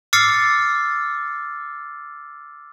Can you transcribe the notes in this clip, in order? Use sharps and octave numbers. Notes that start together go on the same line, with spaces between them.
D6 E6 F6 A6 C7 C#7